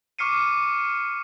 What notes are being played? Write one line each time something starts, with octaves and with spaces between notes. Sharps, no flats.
C#6 D6 F6 C7 C#7 D#7